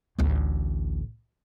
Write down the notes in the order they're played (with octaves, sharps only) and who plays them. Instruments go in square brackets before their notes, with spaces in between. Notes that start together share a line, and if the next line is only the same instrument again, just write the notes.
[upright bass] A1 D2